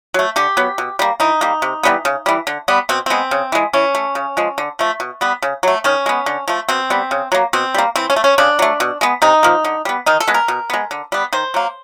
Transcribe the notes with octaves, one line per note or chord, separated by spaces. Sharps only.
F#3 A3
D3 G4
F#3 B3
B2
G3 A#3
E3 D#4
G3 A#3
C3
E3 G3 B3
C#3
E3 G3
D3
G3 B3
B2 C4
G#3 B3 C4
C#3
E3 G#3
E3 C#4
A3
C#3
F3 G#3
D3
F3 A3
B2
G3 B3
C#3
F#3 A3
D#3 C#4
G#3 B3
D3
F3 A3
B2 C4
G3 B3
C#3
F#3 A#3
B2 C4
G3 A#3
E3 C4
C#4
A3
C#4
C#3 D4
F#3 A3
B2
G#3 B3
C3 D#4
F3 A#3
D3
G3 B3
D#3 D#4
A4
G#3 B3
A#4
B2
G#3 B3
D3
G3 B3
D#3 C5
F#3 A#3